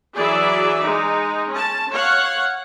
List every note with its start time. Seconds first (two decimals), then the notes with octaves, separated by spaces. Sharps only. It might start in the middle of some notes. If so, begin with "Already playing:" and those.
0.16 E3 F#3 G#4 D5 E5
0.82 G#3 D#4
1.52 C#4 A5
1.91 C#5 F5 F#5